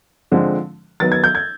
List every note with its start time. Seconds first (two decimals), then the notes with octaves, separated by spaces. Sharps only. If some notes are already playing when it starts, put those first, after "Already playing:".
0.32 D3 F3 G#3 C4
1.00 D#3 F#3 B3 A6
1.12 G#6
1.24 G6
1.35 G#6